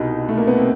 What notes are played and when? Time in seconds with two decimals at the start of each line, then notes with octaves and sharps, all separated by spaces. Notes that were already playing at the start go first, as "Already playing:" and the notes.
Already playing: C2 B2 D#4
0.29 A3
0.37 A#3
0.47 B3
0.57 C4